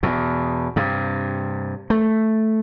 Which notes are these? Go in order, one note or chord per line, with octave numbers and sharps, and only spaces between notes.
E2 B2
G2 C3
A3